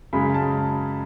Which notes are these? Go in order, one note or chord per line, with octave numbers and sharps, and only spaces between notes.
F#2 C#3 G#3 B5
A5